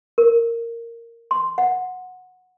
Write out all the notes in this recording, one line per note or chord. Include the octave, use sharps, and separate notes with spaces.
A#4
C6
F#5